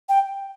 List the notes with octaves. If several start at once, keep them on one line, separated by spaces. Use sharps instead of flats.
G5